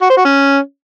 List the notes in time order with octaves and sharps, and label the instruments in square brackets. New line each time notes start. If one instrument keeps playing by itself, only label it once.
[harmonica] F#4
C5
F#4
C#4